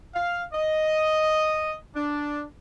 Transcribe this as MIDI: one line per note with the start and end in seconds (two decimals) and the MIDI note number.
0.14 0.42 77
0.53 1.74 75
1.95 2.43 62